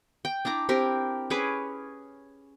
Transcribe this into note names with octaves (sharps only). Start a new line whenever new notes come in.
G5
D4 E4 A#5 D6
C4 G4 A#4
C#4 G#4 B4 D6